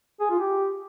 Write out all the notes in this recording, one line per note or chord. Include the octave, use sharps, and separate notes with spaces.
G#4
F4
G4